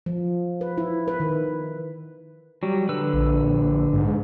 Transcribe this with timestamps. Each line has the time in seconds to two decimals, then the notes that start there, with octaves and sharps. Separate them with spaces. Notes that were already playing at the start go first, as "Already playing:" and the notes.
0.06 F3
0.61 B4
0.78 E4
1.08 B4
1.20 D#3
2.63 F#3 G3
2.89 D3 B4 E6
3.14 A#1
3.93 G#2